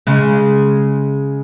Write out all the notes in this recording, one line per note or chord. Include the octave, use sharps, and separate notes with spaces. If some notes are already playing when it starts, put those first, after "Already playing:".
C#3 G#3